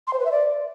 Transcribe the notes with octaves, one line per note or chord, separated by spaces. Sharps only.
C6
C5
B4
E5
D5